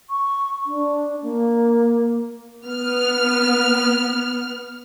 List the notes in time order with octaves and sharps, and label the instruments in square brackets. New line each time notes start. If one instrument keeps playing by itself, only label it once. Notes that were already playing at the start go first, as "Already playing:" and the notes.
[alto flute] C#6
D4
A#3
[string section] B3 F6